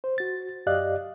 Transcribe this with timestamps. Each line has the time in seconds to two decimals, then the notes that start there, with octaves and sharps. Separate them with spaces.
0.04 C5
0.18 F#4 A6
0.67 F#2 G4 D5 D#5 F5 F#6